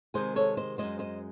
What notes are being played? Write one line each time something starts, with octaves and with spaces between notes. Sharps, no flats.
C3 D#3 G#3 G#4 C5
A4 C#5
C5 D#5
F#2 E3 G#3 C5 D#5
C5 D#5